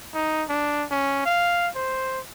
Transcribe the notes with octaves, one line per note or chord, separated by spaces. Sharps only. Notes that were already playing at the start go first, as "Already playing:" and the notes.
D#4
D4
C#4
F5
C5